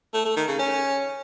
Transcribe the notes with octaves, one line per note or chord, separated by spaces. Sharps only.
A3
A3
D#3
C#3
C#4